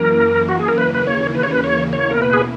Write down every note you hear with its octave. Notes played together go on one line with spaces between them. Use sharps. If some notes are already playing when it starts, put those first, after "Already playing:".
Already playing: F#2 E3 A#3 A#4
F#4
G#4
A#4
D#2 C#3 E3 A#3 B4
B4
C#5
B4
C#5
B4
C#5
B2 A#3 E4 C#5
A#4
B4
G#4